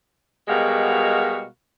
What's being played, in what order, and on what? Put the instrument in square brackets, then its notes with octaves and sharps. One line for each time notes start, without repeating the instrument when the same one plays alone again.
[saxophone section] B2 G3 G#3 F#4 A#4 F5